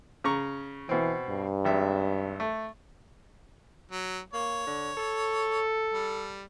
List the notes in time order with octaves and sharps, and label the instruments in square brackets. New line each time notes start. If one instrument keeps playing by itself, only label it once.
[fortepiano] C#3 A#5 C#6
[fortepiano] B2 C4 [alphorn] E3
[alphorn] G2
[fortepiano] G#1 E5
A3
[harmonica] F#3
[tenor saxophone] A#3 [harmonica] C#5
[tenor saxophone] D3
A4
[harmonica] G3